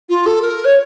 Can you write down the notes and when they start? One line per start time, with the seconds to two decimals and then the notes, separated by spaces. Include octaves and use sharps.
0.09 F4
0.26 A4
0.42 A#4
0.65 C#5